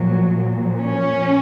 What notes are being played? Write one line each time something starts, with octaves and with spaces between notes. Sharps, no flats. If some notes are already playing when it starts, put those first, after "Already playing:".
Already playing: A#2 F3 F#3
A#2 F3
C#4